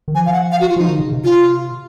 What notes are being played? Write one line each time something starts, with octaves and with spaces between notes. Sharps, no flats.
D#3
F3 G#5
F5
F#5
F5
F#4
F4
F3 D#4
D#3
C#3
C3
F4